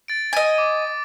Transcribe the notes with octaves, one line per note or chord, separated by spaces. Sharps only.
A6 D7
D#5 G#5
D6